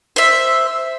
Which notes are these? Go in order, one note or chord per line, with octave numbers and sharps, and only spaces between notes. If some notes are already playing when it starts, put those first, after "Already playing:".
C5 E5